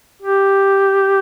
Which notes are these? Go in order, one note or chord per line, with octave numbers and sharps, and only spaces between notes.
G4